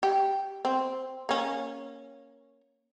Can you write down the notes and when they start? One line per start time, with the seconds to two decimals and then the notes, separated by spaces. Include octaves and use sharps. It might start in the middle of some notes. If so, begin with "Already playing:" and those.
0.03 G4
0.65 C4
1.29 A#3 C#4